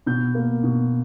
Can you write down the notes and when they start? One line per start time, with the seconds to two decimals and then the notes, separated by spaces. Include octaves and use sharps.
0.06 B2 G6
0.35 A#3
0.63 B2